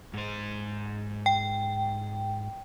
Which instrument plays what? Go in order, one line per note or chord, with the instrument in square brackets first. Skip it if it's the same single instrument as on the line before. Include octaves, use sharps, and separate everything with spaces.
[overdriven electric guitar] G#2 C5
[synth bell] G5